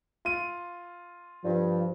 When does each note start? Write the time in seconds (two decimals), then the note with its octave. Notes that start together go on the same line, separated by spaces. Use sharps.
0.25 F4 D#7
1.44 G2 F3